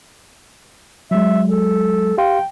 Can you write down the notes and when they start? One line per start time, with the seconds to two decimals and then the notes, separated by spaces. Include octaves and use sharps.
1.11 F#3 G#3 E5
1.48 A4
2.18 G4 F5 G5 C6